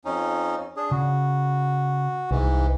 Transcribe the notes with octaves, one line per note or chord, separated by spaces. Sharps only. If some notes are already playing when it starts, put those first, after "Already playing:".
F2 C#4 D#4
D4 G#4
C#3 F#4
C2 G#2 E3